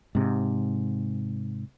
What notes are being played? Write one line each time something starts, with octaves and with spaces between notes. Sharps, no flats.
G#2 C3